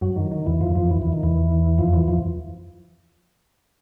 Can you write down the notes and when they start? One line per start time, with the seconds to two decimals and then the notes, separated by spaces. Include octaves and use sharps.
0.01 F#2 F#3
0.16 D#3
0.31 D#3
0.46 E2 E3
0.61 F2 F3
0.75 F2 F3
0.90 E2 E3
1.01 E2 E3
1.13 D#3
1.23 E2 E3
1.78 F2 F3
1.93 E2 E3
2.08 F2 F3